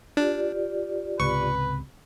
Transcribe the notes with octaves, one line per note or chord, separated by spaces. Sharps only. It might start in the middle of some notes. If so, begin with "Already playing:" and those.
D4 F4 G4 D5
C#2 G#2 C3 B4 C#6